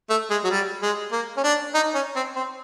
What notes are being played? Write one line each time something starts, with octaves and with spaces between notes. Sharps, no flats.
A3
G#3
F#3
G3
G#3
A#3
C#4
D4
D#4
C#4
C4
C4